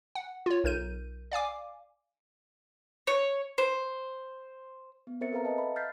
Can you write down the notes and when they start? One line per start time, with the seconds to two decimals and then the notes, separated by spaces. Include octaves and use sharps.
0.15 F#5
0.46 F4 C#5
0.64 B1 A#4 G6 D#7
1.32 D5 F5 G#5 D6
3.07 C#5
3.58 C5
5.07 B3
5.21 C4 A#4 C5 E5 A6 C#7
5.33 A4 B4 F5 A#5
5.45 D#5 A5
5.58 E5 B5
5.76 F6 G6 A6 B6 C7